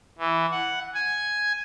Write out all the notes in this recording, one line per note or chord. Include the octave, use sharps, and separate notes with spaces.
E3
F#5
G#5